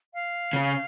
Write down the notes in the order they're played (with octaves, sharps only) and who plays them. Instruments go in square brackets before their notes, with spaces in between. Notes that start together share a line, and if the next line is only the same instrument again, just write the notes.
[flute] F5
[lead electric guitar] C#3